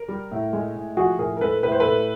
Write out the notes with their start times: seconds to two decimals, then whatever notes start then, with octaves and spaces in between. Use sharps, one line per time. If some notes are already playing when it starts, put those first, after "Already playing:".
Already playing: A#4
0.08 G3
0.31 A2
0.53 G#3
0.75 A2
0.97 F3 F#4 G#4
1.19 A2 G#4 A#4
1.37 A#4
1.41 G#3 A4 B4
1.63 A2 B4
1.72 C5
1.80 A4 B4
1.85 A2